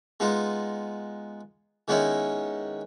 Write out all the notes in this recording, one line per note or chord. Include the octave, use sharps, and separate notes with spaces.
G#3 B3 D#4 F4
D#3 G#3 B3 C#4 D#4 E4